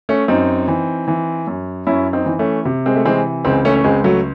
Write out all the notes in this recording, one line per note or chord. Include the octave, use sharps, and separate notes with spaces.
A3 C#4
F#2 C4 D#4
E3
E3
F#2
F#2 C#4 E4
C4 D#4
E3
A3 C#4
C3
G#3 C4
A3
E3 G#3 C4
C#2 G#3 C4
A3 C#4
C#4
C#2 G#3 C4
F#3 A3